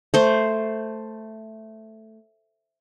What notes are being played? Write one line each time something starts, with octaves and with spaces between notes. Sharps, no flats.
A3 C5